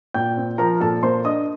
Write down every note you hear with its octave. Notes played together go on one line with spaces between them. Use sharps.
A#2 G5 G6
C4
F3 A#4 A#5
A#2 A4 A5
A#3 C5 C6
D4 D#5 D#6